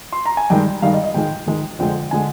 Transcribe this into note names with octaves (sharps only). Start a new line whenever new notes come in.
C6
A#5
G#5
G2 D#3 G#3 G5
G2 D#3 G#3 F5
D#5
D#5
G#2 D#3 G#3 G5
G#2 D#3 G#3
F2 D3 G#3 G5
D3 G#3 G#5